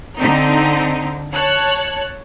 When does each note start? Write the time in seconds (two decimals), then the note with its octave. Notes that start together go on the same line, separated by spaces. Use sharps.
0.18 D3 C4 D#4
1.32 C#5 A5 F#6